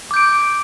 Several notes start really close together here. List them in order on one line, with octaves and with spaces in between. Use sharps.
D6 G6 D7